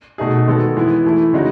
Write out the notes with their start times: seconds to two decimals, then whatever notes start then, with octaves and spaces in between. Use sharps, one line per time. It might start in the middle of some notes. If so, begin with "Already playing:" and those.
0.18 B2 A3 D#4 G#4
0.47 D#3 G#3 B3 F#4 A4
0.76 E3 G#3 B3 E4
1.04 E3 A3 E4
1.33 C#3 G#3 D#4 F#4